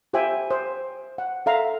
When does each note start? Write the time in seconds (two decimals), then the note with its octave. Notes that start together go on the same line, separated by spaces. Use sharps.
0.13 F4 G4 C5 E5 G5 G#5
0.51 C5
1.18 F#5
1.46 A4 E5 F5 A#5